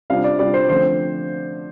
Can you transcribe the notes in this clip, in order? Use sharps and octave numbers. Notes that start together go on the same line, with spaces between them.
C3 G3 D4 F4 F5
D5
C3 G3 D4 F4 D5
C5
D3 F3 A3 C4 C5